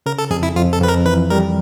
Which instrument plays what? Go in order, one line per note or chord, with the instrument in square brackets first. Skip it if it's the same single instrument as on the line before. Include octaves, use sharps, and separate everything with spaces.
[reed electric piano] C#3 [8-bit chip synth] A#4
[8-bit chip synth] A4
[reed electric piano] F2 [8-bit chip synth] G#4
[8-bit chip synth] E4
[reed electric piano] F2 [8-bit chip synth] F4
[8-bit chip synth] A4
[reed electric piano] F2 [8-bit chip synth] B4
[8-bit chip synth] A#4
[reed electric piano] E3 [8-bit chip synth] B4
[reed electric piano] G3 [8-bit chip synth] A#4